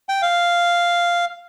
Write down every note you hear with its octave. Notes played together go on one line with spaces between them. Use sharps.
G5
F5